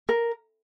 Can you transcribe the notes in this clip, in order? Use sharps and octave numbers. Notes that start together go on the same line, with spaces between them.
A#4